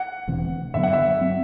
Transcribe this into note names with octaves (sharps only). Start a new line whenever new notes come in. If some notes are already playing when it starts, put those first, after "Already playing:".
Already playing: F#5
E1 D2 C3 E3
G2 D3 F#3 B3 E5
F#5
E5
F#3 C4